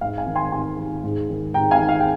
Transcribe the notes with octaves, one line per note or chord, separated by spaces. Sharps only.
G#2 F5
F5 G#5
D#3
G#5 C6
G#2 G#5 C6
D#3
G#2
D#3
G#2 G5 A#5
F5 G#5
D#3
F5
G5